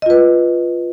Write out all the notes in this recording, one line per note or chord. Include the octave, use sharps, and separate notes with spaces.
F4 B4 D#5